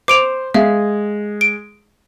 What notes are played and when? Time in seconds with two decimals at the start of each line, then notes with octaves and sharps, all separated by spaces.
0.08 C5 D6 D7 F7
0.54 G#3 E5 F5
1.41 D7